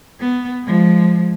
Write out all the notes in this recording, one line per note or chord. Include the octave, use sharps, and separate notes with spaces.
B3
F3 G#3